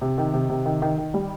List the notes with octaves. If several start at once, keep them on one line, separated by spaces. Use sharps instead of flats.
C3
D#3
C3
C3
D#3
D#3
D#3
G3